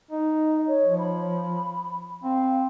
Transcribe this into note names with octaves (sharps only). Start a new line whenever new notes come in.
D#4 D#5
C#5
F3
B5
C4 F5